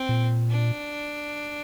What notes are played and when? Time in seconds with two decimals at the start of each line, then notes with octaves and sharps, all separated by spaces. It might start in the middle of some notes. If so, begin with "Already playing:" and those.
Already playing: C4
0.09 A#2
0.50 D4